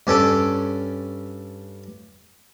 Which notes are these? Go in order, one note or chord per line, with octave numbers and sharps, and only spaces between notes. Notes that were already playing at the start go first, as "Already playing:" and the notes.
G2 C#4 A4 D6